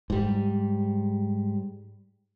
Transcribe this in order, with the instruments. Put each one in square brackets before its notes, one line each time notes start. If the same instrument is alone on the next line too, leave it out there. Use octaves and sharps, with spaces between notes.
[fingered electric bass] G#2 G3